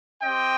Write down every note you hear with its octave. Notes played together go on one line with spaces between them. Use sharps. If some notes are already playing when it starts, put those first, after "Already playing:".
C4 G4 D#5 G5